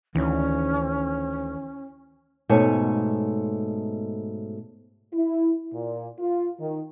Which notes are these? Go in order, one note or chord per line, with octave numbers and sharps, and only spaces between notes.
D2 D#3 E3 C#4
G#2 B2 A3 C#5 G#5
E4
A#2
F4
D#3